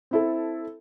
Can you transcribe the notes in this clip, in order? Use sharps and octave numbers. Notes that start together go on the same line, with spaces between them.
C4 E4 A4